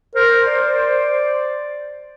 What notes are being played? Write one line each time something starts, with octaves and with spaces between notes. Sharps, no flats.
A#4 C5
D5